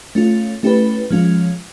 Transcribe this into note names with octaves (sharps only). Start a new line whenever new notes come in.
A3 C#4 F4
A3 C#4 E4 G4 B4
F3 G#3 C#4 F4